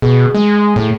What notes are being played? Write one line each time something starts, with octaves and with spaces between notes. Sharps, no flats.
B2 G#4
G#3
A2